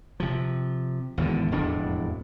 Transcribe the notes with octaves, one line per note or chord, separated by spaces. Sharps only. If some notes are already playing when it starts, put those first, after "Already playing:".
C3 F3
G#1 E2 A2 D3
E1 F2 A2 D4